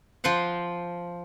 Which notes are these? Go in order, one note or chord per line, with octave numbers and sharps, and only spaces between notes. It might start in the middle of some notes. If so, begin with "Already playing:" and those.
F3 F4 C5 F#5